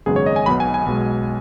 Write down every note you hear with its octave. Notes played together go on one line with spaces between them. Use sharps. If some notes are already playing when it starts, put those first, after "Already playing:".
G#1 F#2 C#3 G#3 B3 G#4
C#5
D#5
G#5
B1 B2 B3 B5
G#5
G#5
B1 B2 G#3